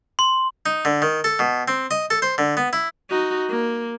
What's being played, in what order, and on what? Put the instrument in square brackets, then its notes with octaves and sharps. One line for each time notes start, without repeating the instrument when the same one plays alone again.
[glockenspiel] C6
[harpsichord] D#4
D3
D#3
A4
B2
C4
D#5
A4
C5
D3
B3
E4
[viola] D#4 F#4
A#3